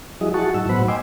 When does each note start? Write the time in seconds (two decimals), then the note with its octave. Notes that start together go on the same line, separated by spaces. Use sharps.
0.21 F3 G3 E4 F#4 G#4 D#5
0.34 E4 F#4 G#4 F#5 A5 C#6
0.54 G#2 F#3 D#4 E6
0.69 A2 F#3 B3 C5 F#5 B5
0.88 D#5 G5 G#5 C6 D6 E6